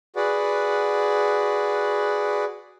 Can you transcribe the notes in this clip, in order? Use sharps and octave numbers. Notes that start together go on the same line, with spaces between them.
F#4 G#4 B4 D5 F#5